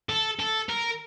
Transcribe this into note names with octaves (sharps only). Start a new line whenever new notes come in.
A4
A4
A#4